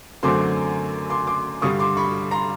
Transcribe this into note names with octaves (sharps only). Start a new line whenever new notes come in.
F#2 D3 F#3 A3 C4 C6 D6
C6 D6
C6 D6
G2 D3 G3 C#6 D#6
C6 D6
B5 C#6
A#5 C6